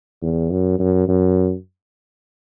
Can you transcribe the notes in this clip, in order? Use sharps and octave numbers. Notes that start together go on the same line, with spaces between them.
E2
F#2
F#2
F#2